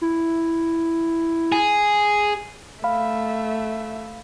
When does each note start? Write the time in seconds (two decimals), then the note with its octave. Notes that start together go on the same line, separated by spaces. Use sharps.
0.02 E4
1.52 G#4
2.84 A3 E5 F5 B5